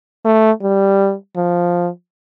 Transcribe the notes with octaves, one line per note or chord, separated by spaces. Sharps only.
A3
G3
F3